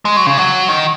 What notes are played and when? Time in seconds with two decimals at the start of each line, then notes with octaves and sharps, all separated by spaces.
0.05 G#3
0.17 F#3
0.27 C#3
0.38 F#3
0.69 D#3